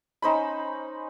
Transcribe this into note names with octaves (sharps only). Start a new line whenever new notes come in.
C#4 D#4 C5 B5